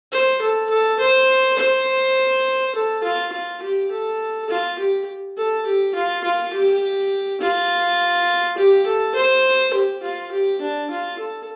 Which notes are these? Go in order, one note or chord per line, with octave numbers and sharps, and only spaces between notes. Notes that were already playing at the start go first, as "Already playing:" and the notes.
C5
A4
A4
C5
C5
A4
F4
F4
G4
A4
F4
G4
A4
G4
F4
F4
G4
F4
G4
A4
C5
G4
F4
G4
D4
F4
A4